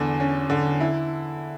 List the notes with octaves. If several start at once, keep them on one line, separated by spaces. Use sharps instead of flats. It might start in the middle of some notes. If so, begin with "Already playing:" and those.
Already playing: E2 D3
C#4
D3
E4